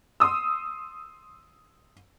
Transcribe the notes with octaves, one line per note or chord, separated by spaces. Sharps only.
C6 D#6 E6